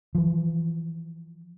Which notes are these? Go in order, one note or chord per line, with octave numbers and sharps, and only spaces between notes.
E3 F3